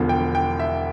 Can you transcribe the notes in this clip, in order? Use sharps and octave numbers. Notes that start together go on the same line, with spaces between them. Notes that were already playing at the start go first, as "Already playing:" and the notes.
Already playing: E1 E2 D3 F3
G5
G5
E5